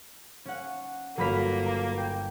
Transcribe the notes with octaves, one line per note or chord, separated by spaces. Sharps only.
C#4 F#5
G1 F#3 A#3 B4 B5 F6 B6
A#5
G5